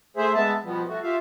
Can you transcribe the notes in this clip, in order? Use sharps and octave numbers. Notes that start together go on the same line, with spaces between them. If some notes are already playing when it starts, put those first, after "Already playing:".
A3 G#4 C5 E5
G#3 B3 E5 A5
B2 F3 G3 B3
A3 F#4
F4 G4 E5 F5